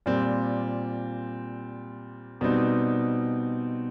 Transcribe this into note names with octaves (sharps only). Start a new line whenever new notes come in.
A#2 G3 C4
B2 G3 C4 D#4